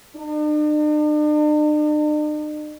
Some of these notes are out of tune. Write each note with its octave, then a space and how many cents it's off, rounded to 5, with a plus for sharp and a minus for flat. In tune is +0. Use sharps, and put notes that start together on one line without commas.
D4 +45